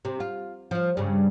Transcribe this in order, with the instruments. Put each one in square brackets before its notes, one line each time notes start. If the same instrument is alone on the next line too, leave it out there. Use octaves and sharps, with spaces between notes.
[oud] C3
F4
F3 F4
G2 C#3